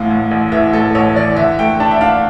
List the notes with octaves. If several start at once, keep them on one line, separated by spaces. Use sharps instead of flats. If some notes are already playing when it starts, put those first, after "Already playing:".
Already playing: A1 A2 F5
A2
A1
E3 E5
A2 A4
A1 C#5
E3 D5
D3 E5
A3 G5
D4 A5
E5
D4 F5